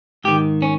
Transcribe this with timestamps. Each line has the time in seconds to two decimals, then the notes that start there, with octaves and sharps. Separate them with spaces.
0.24 G#2 D#3 G4
0.62 C#4